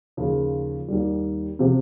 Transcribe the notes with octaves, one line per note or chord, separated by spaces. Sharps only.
D#2 C#3 F3
D#2 D#3 G3
C3 F3 C4